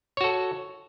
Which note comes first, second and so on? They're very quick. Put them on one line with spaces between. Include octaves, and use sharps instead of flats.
C#5 F#4 A4